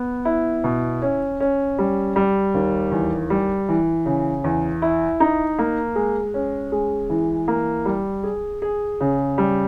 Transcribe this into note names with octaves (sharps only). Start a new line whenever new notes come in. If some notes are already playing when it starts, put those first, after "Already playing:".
Already playing: B3
E4
B2
C#4
C#4
G3
G3
D#2
E2
G3
E3
C#3
E2
E4
D#4
A#3
G#3
C#4
G#3
E3
A#3
G3
G#4
G#4
C#3
G3